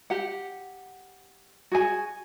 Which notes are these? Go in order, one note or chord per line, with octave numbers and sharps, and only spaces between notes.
G4 F#5
F#4 G#4 G#5